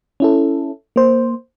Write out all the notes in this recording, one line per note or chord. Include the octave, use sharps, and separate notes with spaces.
C#4 E4 A4
A#3 C5